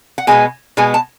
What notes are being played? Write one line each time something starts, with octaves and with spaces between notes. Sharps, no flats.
F#5
B2 G#3 B3 G#5
B2 G#3 B3 G#5
A5